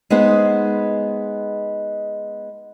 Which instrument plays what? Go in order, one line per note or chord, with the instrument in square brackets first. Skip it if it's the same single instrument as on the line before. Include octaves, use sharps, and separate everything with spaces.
[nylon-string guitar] G#3 B3 D#4 G#4 C5